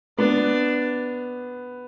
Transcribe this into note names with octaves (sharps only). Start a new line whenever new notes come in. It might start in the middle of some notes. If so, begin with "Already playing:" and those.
B3 D4